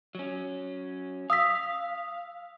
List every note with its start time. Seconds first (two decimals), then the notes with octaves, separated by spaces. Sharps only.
0.15 F#3 C#4
1.30 F5 D#6 E6 B6